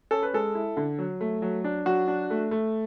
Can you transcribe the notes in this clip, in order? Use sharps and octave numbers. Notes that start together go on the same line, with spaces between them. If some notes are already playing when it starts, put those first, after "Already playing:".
C#4 A4
B4
G#3 A4
E4
D3
F#3
A3
F#3
D4
F#3 F#4
D4
A3
A3